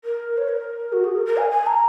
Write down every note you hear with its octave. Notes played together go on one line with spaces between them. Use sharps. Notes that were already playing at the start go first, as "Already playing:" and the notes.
A#4
C#5
A#4
F#4
G#4
A#4
A#4
G#5
G#5
A#5